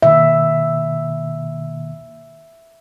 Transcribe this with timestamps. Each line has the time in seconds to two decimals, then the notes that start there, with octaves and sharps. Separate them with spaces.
0.03 B2 D#3 A#3 E5